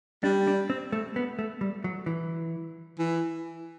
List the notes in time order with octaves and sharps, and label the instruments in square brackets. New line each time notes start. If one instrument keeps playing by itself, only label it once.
[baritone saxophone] G3 [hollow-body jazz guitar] D4
[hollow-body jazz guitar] D4
C4
A3
B3
A3
G3
F#3
E3
[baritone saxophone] E3